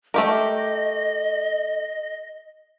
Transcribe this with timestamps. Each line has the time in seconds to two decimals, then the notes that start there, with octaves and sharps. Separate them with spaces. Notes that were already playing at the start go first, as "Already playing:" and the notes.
0.14 A3 G4 A#4 D#5